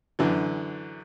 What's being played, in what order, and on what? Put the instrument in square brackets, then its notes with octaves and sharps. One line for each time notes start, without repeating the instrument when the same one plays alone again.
[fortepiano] F#2 D3 E3